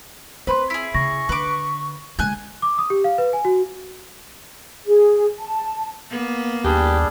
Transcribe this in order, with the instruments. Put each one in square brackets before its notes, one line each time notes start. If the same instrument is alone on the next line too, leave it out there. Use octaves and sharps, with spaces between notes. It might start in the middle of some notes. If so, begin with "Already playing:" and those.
[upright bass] C4 [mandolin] B4 [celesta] C5 B5 C6
[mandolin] E4 G#4 [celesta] B6
[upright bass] C#3 [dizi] C#6 [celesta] A#6
[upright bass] D3 [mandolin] B4 D6
[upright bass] D3 G#3 [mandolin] G#5 F#6 G6
[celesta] D6
D#6
G4
F5
B4
G#5
F#4
[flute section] G#4
A5
[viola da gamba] A#3 B3
[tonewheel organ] D#2 [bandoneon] G3 D4 G#4 [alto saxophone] G4